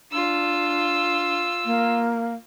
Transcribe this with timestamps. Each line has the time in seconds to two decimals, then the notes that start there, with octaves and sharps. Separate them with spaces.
0.12 D4 F4 E6
1.65 A#3